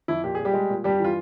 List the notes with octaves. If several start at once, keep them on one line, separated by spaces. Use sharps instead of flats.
F2 E4
A#2 G4
A#2 G#4
G3 G4
G#3
A#2
G2 G3 G4
E3 F4